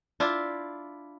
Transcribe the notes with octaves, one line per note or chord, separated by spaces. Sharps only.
D4 E4 F4